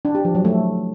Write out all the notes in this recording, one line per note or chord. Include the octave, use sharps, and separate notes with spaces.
D4
G4
F3
F#3
A3